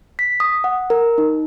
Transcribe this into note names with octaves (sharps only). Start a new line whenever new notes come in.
B6
D#6
F#5
A#4
D#4